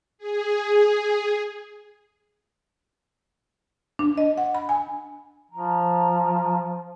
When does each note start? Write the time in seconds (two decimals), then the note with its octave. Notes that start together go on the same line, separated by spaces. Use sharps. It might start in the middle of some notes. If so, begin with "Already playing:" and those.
0.18 G#4
3.99 D4
4.18 D#5
4.38 F#5
4.55 B5
4.69 G#5
5.51 F3 A#5